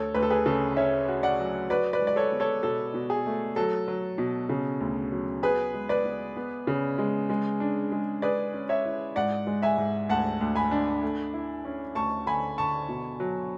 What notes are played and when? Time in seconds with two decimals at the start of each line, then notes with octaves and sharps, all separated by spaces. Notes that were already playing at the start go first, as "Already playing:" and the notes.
Already playing: D2 A4 C#5
0.14 D2 B4
0.22 A4
0.30 G#4 B4
0.46 C#3 A4
0.76 C#4 C#5 E5
1.08 F#4
1.23 D5 F#5
1.39 F#3
1.70 F#4 B4 D5
1.93 B4 D5
2.01 G#3
2.07 D5
2.16 A4 C#5
2.32 B3
2.40 A4 C#5
2.63 B2 A4
2.94 B2
3.10 G#4
3.26 A3
3.56 F#3 A4
3.88 F#3
4.18 B2
4.49 C#3
4.80 D2
5.12 F#3
5.43 B3 G#4 B4
5.74 G#3
5.89 B4 D5
6.05 B3
6.37 B3
6.67 C#3
6.98 G#3
7.30 G#3
7.60 D4
7.92 G#3
8.22 G#4 B4 D5
8.54 C#4
8.69 C#5 E5
8.85 E4
9.16 G#2 D5 F#5
9.47 G#3
9.62 E5 G#5
9.78 G#2
10.09 D2 F#5 A5
10.41 D2
10.55 G#5 B5
10.71 D4
11.02 A3
11.34 E4
11.65 C#4
11.95 D2 A5 C#6
12.26 D3 G#5 B5
12.58 D3 A5 C#6
12.89 B2
13.20 F#3